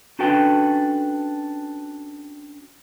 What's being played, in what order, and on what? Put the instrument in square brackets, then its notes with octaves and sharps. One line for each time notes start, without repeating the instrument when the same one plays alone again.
[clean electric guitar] C#4 D4 F#4 A4 B4 G5